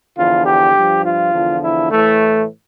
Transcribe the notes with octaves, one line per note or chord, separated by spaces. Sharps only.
E2 D3 F3 F4
G4
G2 F3
F4
E2 D3 F3
E4
A2 E3 A3